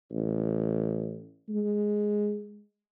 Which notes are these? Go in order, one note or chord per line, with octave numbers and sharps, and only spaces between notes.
A1
G#3